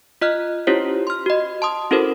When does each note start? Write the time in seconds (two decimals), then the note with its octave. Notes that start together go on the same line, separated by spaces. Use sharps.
0.21 F4 D#5 F6 F#6
0.67 C#4 E4 F4 G4 C5 C#5
1.07 C6 F6
1.26 F#4 D#5
1.62 A5 C6 D#6
1.91 C#4 E4 F#4 A4 A#4 C5